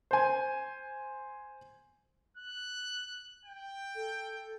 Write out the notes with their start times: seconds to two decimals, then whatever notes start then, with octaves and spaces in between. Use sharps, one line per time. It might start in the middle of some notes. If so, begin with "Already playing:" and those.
0.11 C5 G#5
2.37 F#6
3.45 G5
3.95 A4